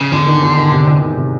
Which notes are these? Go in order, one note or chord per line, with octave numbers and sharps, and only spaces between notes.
C#3
E2 D3
D#3
E2
D#3
C3
E2
D#3
C3